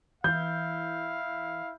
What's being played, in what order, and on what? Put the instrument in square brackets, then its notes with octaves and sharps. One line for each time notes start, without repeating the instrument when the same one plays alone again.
[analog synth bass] E3 [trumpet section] E4 F5 [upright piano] G6